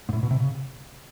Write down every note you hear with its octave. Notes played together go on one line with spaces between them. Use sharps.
G#2
A2
B2
C3
C#3